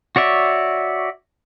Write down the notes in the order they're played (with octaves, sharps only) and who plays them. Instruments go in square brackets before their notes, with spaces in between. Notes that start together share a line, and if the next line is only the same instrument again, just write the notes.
[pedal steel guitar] F#4 C#5 D5 E5